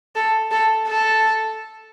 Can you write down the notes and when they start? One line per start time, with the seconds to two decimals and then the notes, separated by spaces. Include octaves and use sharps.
0.15 A4
0.51 A4
0.87 A4